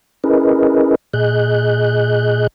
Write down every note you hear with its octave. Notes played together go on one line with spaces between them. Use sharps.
C#4 E4 G#4 A#4 B4 D#5
A#2 G#4 D#5 F#6 G6